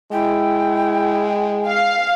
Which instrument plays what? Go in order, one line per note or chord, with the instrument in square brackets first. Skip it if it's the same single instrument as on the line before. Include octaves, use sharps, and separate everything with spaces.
[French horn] G#3 [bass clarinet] E4 [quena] G5
[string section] F5